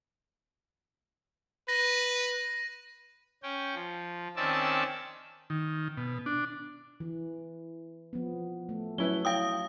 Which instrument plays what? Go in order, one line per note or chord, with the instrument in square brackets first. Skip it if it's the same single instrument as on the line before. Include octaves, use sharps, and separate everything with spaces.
[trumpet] B4 [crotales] A#6 D#7
[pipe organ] C#4 G5
F3
D#3 C4 C#4 D5 E5 A5
[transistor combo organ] D#3
B2
D4
[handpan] E3
F3 B3
A3
[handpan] F#3 [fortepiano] C#4 E4 B4 [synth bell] G7
[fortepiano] E4 G5 [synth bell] F5 D#6